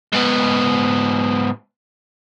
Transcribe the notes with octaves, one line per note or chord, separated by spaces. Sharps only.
G#2 B3